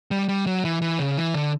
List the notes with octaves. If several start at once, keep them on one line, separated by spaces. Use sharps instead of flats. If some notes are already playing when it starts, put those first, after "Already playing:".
G3
G3
F#3
E3
E3
C#3
E3
D3